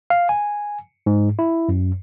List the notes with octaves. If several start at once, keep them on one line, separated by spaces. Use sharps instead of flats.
F5
G#5
G#2
E4
F#2